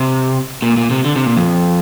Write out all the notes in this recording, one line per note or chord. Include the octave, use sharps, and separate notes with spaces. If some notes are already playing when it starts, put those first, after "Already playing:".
Already playing: C3
A#2
A#2
C3
D3
C3
A#2
F2